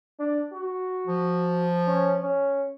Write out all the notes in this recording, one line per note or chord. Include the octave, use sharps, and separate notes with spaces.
D4
F#4
F3
C#4
C#4